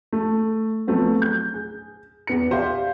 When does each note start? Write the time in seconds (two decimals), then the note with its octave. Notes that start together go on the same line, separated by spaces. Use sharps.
0.13 A3
0.87 F3 F#3 A3 B3 C4
1.22 G6
1.54 G#4
2.27 E2 B3 C#7
2.51 G4 C5 D5 E5 F5